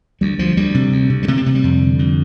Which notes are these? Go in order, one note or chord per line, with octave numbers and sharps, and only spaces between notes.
D2 G3
D2 F3
D2 G3
C3
D2
C3
G3
C3 A3
C4
C3 A3
G3
F2
D3
F2